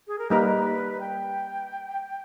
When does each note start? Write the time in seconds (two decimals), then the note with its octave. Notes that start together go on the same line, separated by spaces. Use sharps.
0.07 G#4
0.19 A#4
0.30 G3 A#3 D#4 A#4 B4
1.00 G5